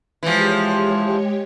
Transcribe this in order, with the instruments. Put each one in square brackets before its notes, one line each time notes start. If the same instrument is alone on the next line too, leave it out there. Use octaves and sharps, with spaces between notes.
[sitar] E3 F3 [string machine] G#3 G4 C#5